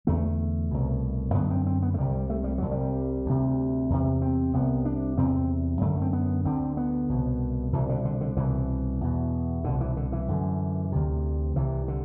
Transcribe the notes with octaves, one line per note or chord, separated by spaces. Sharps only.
E2 D3 A3
C2 B2
F#2 D3 B3
C4
C4
B3
A3
C2 C3 G3
A3
G3
C2 C3 F#3
G3
D2 C3
E2 C3
C4
C2 C3 B3
D4
E2 C3 C4
F#2 D3 A3
C4
B3
D2 D3 C4
B3
C2 B2
C2 B2 E3
D3
D3
D3
C2 B2 E3
E2 B2
C2 B2 D3
E3
D3
E3
F#2 D3
D2 C3
C2 C3 E3
D3